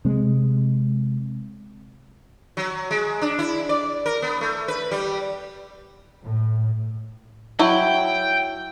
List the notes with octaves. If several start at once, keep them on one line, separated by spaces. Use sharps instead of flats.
C3 G#3
F#3
G#3
D4
E4
D5
A#4
B3
A3
B4
G3
A2
F#3 E4 G5